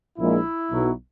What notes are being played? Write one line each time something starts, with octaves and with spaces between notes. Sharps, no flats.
A#1 A#2 G#3 E4
B1 B2 F#3